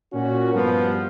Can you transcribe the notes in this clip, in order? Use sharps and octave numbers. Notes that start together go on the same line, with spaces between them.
A#2 C#4 F#4
G2 F3 B3